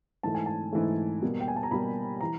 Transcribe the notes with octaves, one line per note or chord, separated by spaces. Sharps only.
G#2 E3 A3 A5
G#5
A5
G#2 E3 A3
B2 G3 A#3
G5
G#5
A5
A#5
B2 G3 A#3 B5
E3 A#5